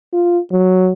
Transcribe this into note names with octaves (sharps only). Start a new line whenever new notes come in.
F4
F#3